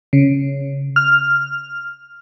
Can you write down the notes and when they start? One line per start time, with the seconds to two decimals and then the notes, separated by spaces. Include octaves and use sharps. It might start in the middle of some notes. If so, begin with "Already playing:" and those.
0.13 C#3
0.96 F6